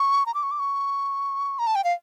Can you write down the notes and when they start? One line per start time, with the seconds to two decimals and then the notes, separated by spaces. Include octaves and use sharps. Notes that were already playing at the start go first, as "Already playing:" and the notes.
Already playing: C#6
0.26 A#5
0.34 D6
0.43 C#6
0.51 D6
0.59 C#6
1.59 A#5
1.67 A5
1.75 G5
1.84 F5